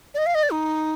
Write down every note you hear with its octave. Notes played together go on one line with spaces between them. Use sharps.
D5
D#5
F5
D#5
D5
D#4